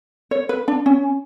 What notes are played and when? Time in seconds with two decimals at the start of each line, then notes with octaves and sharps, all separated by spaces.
0.31 C#5
0.49 B4
0.68 D4
0.86 C#4